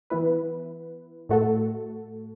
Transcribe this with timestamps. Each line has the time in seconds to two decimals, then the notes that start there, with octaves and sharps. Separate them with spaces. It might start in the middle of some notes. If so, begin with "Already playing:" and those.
0.10 E3 B3 E4 B4
1.29 A2 A3 F#4 A4